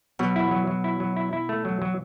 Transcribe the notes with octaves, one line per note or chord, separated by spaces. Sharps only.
B2 F#3
E4
F#3
F#3
E4
F#3
E4
E4
A3
F#3
F#3